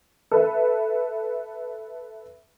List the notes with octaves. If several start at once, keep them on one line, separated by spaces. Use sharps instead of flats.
A4 B4 E5